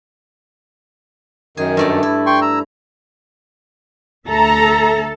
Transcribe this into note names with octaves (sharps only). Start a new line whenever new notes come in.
F#2 D#3 G#4
G2 A3 D5
E4
G5 C6 C#6
A#5 E6
D2 A4 E5 A#5